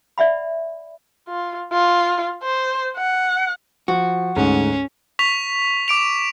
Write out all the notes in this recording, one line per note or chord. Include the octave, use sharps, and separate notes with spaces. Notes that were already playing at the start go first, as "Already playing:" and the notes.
D5 E5 F#5 B5
F4
F4
C5
F#5
F3 F#4
D2 G#2 C#4
C#6 B6 F7
D6 D7 F7